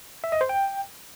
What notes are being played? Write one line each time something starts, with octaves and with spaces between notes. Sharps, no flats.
E5
D#5
C5
G5